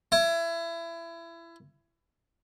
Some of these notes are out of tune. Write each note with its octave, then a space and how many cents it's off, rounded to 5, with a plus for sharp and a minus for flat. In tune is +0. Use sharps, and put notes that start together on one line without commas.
E4 +25